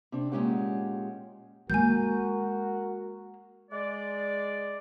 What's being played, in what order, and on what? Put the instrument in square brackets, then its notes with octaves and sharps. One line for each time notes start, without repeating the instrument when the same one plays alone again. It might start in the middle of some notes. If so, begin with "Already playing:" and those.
[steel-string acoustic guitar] C3 D4
A#2 G3 G#3 C#4 G4 F#5
[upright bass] G#3 A#3 [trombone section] F#4 A#4 [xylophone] G#5 G6
[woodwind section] G#3 D5